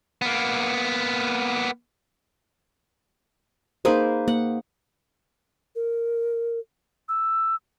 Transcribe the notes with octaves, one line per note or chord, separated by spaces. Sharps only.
A#3 B3
A#3 D#4 G#4 B4 C5
A#3 F#5
A#4
E6